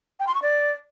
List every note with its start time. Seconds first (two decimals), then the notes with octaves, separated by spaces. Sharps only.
0.20 G5
0.27 C6
0.35 C#6
0.42 D5